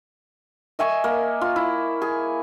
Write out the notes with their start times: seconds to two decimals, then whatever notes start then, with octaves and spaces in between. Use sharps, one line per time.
0.79 D#5 E5 G#5 C#6
1.04 A#3
1.41 F4
1.56 E4
2.02 G#4